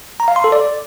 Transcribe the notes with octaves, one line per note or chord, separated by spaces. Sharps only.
A#5
F5
C6
A4
D5